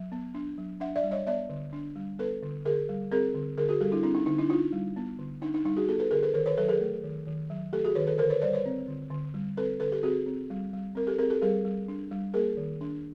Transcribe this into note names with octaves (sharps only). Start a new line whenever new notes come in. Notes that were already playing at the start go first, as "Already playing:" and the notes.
Already playing: F#3
B3
D4
F#3
D4 E5 F#5
D5 E5
G3
C#5 D#5
B3 D5 E5
D3
D4
G3
B3 A4 B4
D3
D3 G#4 A#4
G3
C4 G#4 A#4
D3
D3 G#4 A#4
F#4 G#4
G3 G4 A4
D4 E4
C4 D4 E4
D#4
D3 D#4
D4 E4
D4 D#4 F4
G3
B3
D3
D4 D#4
D#4
G3 D#4
F#4 G#4
B3 G4 A4
A4 B4
D3 G#4 A#4
A4 B4
D#3 A#4 C5
B4 C#5
F#3 A4 B4
G#4 A#4
A3
D#3
D#3
F#3
A3 G4 A4
F#4 G#4
D#3 B4 C#5
A4 B4
D3 A#4 C5
B4 C#5
G3 C5 D5
B4 C#5
C4
D3
D3
G3
C4 A4 B4
D3 A4 B4
G4 A4
C4 F#4 G#4
C4
G3
G3
C4 A#4
G4 A4
C4 G#4 A#4
G4 A4
G3 G#4 A#4
G3
D4
G3
A#3 G#4 A#4
D#3
D4